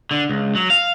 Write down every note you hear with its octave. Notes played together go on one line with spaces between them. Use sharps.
D3
C#2
F#3
F5